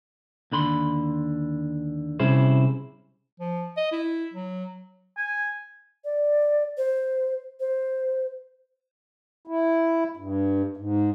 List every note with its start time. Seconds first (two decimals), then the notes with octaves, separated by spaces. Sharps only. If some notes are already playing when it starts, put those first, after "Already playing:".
0.52 D#2 D3 B5 C6
2.20 C3 G3 C#4 E4 G#4 C5
3.40 F3
3.77 D#5
3.92 E4
4.34 F#3
5.17 G#5
6.05 D5
6.78 C5
7.60 C5
9.47 E4
10.17 G2
10.77 G#2